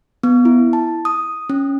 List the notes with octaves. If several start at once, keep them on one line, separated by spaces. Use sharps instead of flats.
B3
E4
A5
D#6
C#4